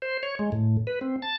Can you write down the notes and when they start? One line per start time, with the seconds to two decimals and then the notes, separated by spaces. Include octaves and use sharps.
0.02 C5
0.23 C#5
0.39 G#3
0.52 A2
0.87 B4
1.01 C4
1.22 A5